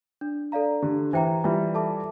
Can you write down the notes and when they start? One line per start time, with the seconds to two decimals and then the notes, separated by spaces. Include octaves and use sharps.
0.21 D4
0.52 A4 D5 F5 A#5
0.82 D3 G4
1.13 E3 C5 G5 A#5
1.44 E3 G3 F4
1.74 A4 E5 A5 D6